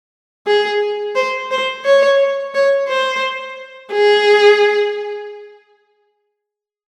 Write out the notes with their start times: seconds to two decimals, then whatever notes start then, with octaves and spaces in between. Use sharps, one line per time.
0.47 G#4
1.16 C5
1.51 C5
1.85 C#5
2.54 C#5
2.89 C5
3.93 G#4